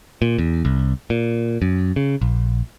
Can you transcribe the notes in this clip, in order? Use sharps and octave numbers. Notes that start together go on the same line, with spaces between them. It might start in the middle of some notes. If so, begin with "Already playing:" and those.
A#2
E2
C2
A#2
F#2
C#3
A#1